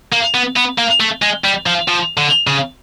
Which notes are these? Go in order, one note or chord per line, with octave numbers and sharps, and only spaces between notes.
A#3
B3
B3
A#3
A3
G#3
G3
F3
F3
D3
C#3